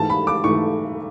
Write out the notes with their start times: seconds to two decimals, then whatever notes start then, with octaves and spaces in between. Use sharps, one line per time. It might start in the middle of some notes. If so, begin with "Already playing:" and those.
Already playing: G#2 E3 A3 A5
0.10 B5
0.27 D6
0.44 G#2 E3 A3 C#6